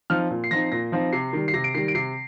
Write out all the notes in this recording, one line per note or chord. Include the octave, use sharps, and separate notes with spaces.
F3 C4 D#4 F6
A#2
C7
F3 C4 D#4 A#6
A#2 A#6
F3 C4 D#4
C3 C7
D#3 G3
C7
C3 A#6
D7
D#3 G3 C7
D7
C3 C7